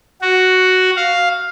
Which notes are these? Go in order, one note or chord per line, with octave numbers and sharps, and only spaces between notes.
F#4
F5